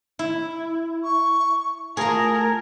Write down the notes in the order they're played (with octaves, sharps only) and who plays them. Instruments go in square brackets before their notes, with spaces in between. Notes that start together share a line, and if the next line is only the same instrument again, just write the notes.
[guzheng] E4
[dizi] C#6
[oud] A3 F4 [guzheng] G#4 A#5 [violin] A#4 [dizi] A5